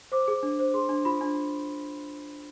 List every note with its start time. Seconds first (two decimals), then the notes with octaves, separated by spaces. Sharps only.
0.12 C5 D6
0.28 G#4
0.43 D4
0.59 C5
0.74 G#4 C6
0.89 D4
1.05 F4 B5
1.21 D4